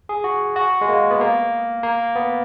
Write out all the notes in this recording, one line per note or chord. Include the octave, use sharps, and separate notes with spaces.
G#4
F#4
F#4
G#3
A#3
B3
A#3
A#3
B3